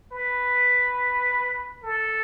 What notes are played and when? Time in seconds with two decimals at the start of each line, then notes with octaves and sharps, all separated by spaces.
0.12 B4
1.83 A4